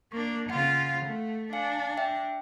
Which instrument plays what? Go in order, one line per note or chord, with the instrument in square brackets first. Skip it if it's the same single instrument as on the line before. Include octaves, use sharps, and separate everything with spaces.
[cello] A#3 D4 [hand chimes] C#6
[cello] C#3 F4 [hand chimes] F5 F#5
[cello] A3
[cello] D4 [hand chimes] F5 G#5 C#7
[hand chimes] E5 G5